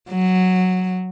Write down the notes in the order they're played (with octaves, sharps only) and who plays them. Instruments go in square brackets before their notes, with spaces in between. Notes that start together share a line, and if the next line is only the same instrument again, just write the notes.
[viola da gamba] F#3